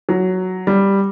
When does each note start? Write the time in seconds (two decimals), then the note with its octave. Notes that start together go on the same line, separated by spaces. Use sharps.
0.09 F#3
0.67 G3